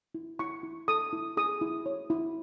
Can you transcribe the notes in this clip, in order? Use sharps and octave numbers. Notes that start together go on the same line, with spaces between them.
E4
E4 C#6
E4
A4 D#6
E4
G#4 D#6
E4
C#5
E4